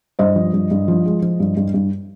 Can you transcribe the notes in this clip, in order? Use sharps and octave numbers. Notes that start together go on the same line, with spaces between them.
G2 C5 D#5
F3
G2
G2
F3
G#3
F3
G2
G2
G2